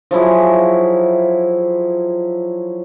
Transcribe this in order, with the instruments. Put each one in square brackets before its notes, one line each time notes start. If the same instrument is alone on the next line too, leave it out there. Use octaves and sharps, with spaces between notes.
[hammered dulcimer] F3 F#3 E4 G#4